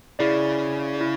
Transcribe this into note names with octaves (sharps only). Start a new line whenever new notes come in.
C#3 E4 G#4 D5
E4